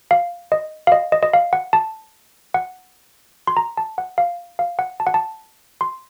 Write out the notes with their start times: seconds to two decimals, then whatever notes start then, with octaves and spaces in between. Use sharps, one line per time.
0.11 F5
0.52 D#5
0.87 F5
0.92 D#5
1.12 D#5
1.23 D#5
1.33 F5
1.53 F#5
1.73 A5
2.54 F#5
3.47 C6
3.57 A#5
3.77 A5
3.98 F#5
4.18 F5
4.59 F5
4.79 F#5
5.00 A5
5.07 F#5
5.14 A5
5.81 C6